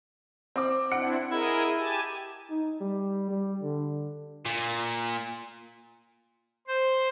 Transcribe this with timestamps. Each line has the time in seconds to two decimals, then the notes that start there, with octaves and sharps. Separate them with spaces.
0.56 C4 D6
0.92 C4 D4 E4 F#5 C#7 D7
1.31 E4 G#4 A#4 D#5
1.79 G4 G#5 A5
2.50 D#4
2.81 G3
3.31 G3
3.63 D3
4.45 A#2
6.67 C5